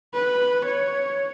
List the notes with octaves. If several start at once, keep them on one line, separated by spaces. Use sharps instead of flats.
B4
C#5